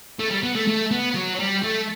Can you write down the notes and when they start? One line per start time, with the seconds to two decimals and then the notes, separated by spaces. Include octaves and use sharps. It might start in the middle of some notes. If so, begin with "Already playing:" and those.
0.20 A3
0.31 G3
0.43 B3
0.55 A3
0.68 A3
0.92 B3
1.16 F#3
1.40 G3
1.64 A3